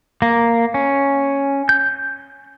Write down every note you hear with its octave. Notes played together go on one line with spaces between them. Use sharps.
A#3
C#4
G6